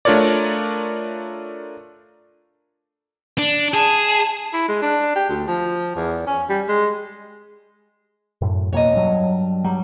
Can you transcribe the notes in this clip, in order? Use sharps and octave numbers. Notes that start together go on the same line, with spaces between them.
A3 D4 F4 A#4 C#5 D5
D4
G#4 A5
E4
G#3
D4
G4
D2
F3
E2
C#4
G3
G#3
F#2 A2
F2 B2 A#3 C#5 D#5
G2 F#3
G2 F#3 G3